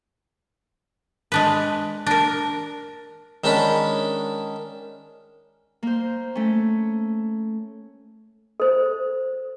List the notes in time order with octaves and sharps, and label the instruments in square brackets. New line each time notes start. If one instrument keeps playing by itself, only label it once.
[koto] G#3 D4 B4
D4 A#4
[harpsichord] D#3 G#3 C#4 D4 B5
[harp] A#3 C5
A3 C#4
[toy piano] A4 C5